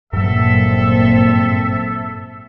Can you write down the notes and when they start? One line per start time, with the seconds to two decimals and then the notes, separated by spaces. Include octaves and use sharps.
0.13 G#1 G2 A#2 F#3 C4 A4 E5